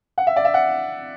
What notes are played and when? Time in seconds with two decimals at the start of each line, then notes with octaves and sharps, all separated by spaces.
0.18 F#5
0.27 E5
0.36 D5
0.45 E5
0.54 F#5